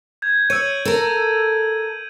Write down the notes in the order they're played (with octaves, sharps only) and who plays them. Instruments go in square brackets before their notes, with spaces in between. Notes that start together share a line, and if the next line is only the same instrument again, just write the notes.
[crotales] G6 G#6
[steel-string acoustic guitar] C#5 [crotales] E6 D7 D#7
[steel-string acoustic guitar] A4 A#4